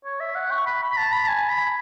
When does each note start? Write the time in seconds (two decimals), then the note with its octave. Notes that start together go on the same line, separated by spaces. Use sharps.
0.05 C#5
0.20 E5
0.35 F#5
0.51 C#6
0.66 B5
0.82 B5
0.97 A5
1.13 B5
1.28 G#5
1.49 B5